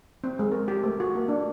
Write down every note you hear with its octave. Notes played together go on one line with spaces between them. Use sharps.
C4
G#3
A#4
G4
A3
F#4
A#3
D4